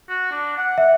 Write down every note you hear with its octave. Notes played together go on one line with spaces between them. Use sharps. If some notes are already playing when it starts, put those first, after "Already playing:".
F#4
D4
F#5
E5